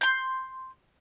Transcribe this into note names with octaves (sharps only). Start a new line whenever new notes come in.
C6 G6